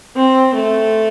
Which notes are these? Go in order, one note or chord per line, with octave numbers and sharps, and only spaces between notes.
C4
A3